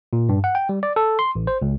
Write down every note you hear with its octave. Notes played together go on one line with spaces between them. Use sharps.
A#2
G2
F#5
G5
G3
D5
A4
C6
A1
C5
C#2